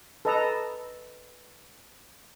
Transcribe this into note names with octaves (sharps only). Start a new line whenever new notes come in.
A4 B4 D#5 A#5